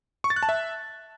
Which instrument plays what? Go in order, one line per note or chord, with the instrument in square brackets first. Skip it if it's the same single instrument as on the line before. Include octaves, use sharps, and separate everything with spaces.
[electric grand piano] C#6
A6
F#6
A5
E5